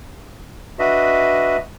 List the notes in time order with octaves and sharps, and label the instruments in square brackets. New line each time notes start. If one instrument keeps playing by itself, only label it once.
[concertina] D4 F#4 B4 D#5 E5